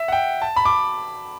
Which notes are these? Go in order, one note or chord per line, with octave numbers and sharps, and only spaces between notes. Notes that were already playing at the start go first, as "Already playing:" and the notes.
Already playing: E5
F#5
G5
A5
B5
D6